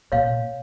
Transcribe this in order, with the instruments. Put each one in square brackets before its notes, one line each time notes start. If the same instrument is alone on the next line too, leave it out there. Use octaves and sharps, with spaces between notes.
[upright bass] A#2 [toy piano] C#5 F5